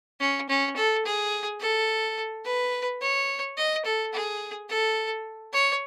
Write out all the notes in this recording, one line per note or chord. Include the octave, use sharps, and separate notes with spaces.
C#4
C#4
A4
G#4
A4
B4
C#5
D#5
A4
G#4
A4
C#5